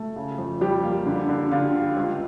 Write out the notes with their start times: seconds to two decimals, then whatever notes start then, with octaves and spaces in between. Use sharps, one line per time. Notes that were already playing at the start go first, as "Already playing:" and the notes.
Already playing: A3
0.16 C#3
0.38 F2
0.61 F2 G3 G4
0.83 A#3
1.06 D3
1.29 D3
1.51 D3 F4
1.73 G3
1.97 C#2